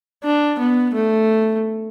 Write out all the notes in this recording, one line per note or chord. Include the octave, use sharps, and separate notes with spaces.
D4
B3
A3